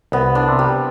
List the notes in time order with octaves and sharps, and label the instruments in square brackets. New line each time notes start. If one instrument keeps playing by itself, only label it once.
[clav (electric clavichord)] C2 [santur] B3
[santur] D4
[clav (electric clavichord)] C3
[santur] G3